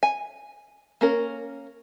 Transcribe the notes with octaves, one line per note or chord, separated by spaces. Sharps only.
G#5
A#3 C#4 A#4